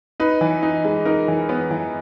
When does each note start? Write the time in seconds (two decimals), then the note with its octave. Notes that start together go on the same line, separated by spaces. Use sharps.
0.20 D#4 B4
0.41 E3
0.63 D#4
0.85 G#3
1.05 D#4 A#4
1.28 E3
1.49 B3
1.71 E3